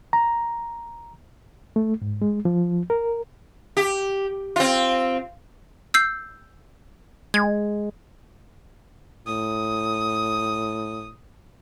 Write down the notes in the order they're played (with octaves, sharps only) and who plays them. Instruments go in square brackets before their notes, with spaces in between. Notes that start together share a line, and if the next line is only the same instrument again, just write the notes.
[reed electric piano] A#5
A3
G#2
G#3
F3
A#4
[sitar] G4
C4 F4
[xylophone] E6 G6 C7
[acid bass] G#3 [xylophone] G#6
[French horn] A2 [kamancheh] D#6